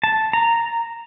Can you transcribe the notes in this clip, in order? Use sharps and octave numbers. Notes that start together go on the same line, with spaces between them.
A5
A#5